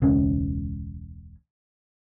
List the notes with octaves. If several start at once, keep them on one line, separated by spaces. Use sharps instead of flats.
E1 C#2 C#4